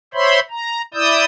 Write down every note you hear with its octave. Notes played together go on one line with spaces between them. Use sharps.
C5 C#5 E5 B5 C6
A#5
E4 D5 D#6 E6 G6